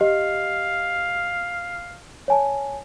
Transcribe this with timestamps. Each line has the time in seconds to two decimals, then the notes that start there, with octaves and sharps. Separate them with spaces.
0.01 G4 D#5 F5
2.28 C#5 G#5 A5